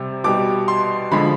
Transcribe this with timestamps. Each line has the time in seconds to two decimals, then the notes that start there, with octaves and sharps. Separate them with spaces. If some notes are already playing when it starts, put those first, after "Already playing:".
Already playing: C3 G3
0.24 B2 G3 D6
0.68 C6
1.12 D3 F3 G#3 B5